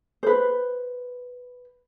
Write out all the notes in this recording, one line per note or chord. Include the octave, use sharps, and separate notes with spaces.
B4 C5